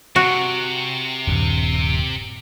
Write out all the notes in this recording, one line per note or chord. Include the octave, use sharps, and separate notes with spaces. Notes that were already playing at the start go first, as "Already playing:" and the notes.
C3 F#4
D#1 G2